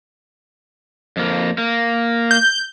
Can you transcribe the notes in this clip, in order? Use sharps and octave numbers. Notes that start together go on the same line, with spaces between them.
F2 A#3
A#3
G6